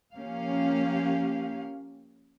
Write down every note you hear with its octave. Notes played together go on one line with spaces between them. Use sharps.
F3 A#3 C#4 G4 F5